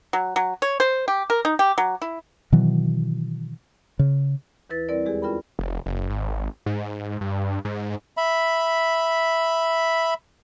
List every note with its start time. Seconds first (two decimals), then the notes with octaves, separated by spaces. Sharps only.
0.13 F#3
0.36 F#3
0.62 C#5
0.80 C5
1.08 G4
1.30 A#4
1.45 D#4
1.59 G4
1.78 F#3
2.02 E4
2.52 B2 D#3 E3 F#3
3.99 C#3
4.70 D#2 E3 E4 B4 A6
4.89 G3 C4 E4 A#4 D5
5.05 E2 G#3 G4 G#4
5.22 C#4 F4 A#4 G5 B5
5.59 F1
5.86 F#1
6.10 G#1
6.66 G#2
7.21 G2
7.65 G#2
8.17 E5 B5